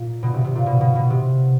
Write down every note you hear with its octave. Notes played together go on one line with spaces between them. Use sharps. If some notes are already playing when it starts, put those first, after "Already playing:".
Already playing: A#2
B2
C3
C3
A#2
B2
B2
B2
C3